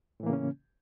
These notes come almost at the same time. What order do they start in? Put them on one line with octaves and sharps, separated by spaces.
A2 E3 A#3 C#3 C#4